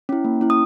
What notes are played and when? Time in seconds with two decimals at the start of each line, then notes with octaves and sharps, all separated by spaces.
0.09 C#4 E4
0.24 A#3
0.41 C#4 E4
0.50 D#6